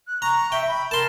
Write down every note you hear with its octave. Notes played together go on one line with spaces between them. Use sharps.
F#6
A#5 C#6
E5 G5
B5
A#4 A5 C6